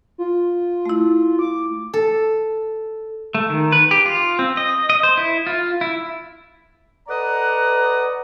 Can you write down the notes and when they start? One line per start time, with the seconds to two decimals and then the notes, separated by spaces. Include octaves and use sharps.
0.18 F4
0.86 A3 E4
1.39 D6
1.94 A4
3.35 A3
3.50 D#3
3.72 B4
3.91 G4
4.06 F4
4.39 C4
4.57 D#5
4.90 D#5
5.03 C5
5.17 E4
5.47 F4
5.81 E4
7.08 A4 B4 D5 D#5 F#5 A#5